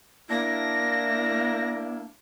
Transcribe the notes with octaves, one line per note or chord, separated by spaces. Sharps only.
A#3 D4 E4 A#6